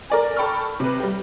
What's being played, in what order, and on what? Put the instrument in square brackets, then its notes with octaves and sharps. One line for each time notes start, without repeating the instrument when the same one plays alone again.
[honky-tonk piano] A#4 D5 G#5
A4 G5 B5 C#6 F6
C3 B4
G3 G4